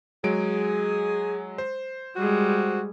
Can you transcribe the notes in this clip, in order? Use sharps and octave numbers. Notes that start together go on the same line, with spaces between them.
F#3 G#3 G#4 D7
C5
G3 G#3 F#4